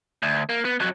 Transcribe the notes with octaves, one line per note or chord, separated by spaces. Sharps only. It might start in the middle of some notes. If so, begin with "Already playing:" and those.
D2
A#3
B3
F2 F#3